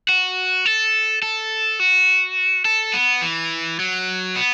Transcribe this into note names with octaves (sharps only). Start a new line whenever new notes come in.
F#4
A4
A4
F#4
A4
B3
E3
F#3
B3